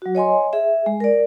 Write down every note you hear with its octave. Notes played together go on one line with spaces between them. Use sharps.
F#3 F#4
C#5 D#5 G#5 C6
G#4 E5
G#3
A#4 D5